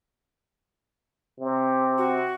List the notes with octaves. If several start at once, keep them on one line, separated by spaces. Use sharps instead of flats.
C3
F#4